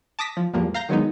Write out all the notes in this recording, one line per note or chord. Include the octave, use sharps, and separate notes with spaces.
A5 D6 D#6 A#6 B6
F3
E2 A2 F3 G3 A#3
F5 A#5 G6 A#6
D#3 F#3 G#3 B3 D#4